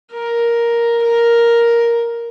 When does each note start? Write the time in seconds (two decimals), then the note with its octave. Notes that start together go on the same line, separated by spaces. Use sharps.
0.13 A#4
1.03 A#4